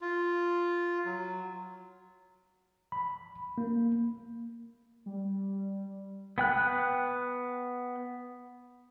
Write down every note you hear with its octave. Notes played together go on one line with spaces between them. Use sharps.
F4
F#3
B5
A#3
G3
B3 G5 F#6